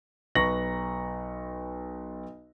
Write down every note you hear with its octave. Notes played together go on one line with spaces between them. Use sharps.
B1 B4 A#5 C#6 A#6 F#7